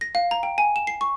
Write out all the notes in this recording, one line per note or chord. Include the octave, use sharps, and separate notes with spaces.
A#6
F5
A#5
G5
G#5
E7
C7
C#6